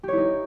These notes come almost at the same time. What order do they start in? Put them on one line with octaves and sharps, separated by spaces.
G4 C#5 E4 D#4